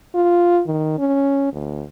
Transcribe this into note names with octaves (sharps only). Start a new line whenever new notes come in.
F4
D#3
C#4
D2